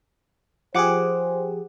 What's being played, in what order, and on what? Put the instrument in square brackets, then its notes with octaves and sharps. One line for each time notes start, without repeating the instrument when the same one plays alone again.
[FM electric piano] F3 G4 G#4 [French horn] C5 [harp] F#5 D6